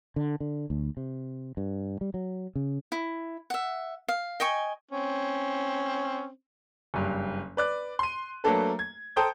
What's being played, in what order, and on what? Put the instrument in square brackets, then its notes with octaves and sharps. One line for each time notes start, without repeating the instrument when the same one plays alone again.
[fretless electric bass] D3
D3
D2
C3
G2
G3
F#3
C#3
[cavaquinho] E4
E5 F#5
F5
D#5 G5 G#5 C#6
[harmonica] C4 C#4
[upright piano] F#1 G2
B4 D5 F#6
C6 D#7
F#3 A3 A#3 D4 A4 B4
G#6
A4 C5 G5 A#5 D#6 G6